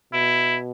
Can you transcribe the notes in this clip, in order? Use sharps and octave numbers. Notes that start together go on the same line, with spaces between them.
B2 E4